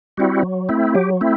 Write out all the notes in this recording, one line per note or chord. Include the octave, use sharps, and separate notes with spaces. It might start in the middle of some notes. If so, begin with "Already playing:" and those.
G3 C4 E4 F#4
F#3
A3 C4 E4
F#3 G4
A3 C4 E4